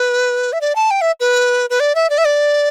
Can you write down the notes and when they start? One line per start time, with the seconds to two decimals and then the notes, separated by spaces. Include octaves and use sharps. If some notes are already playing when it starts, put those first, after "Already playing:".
Already playing: B4
0.53 E5
0.61 D5
0.75 A5
0.91 G5
1.01 E5
1.20 B4
1.70 B4
1.80 D5
1.95 E5
2.10 D5
2.18 E5
2.25 D5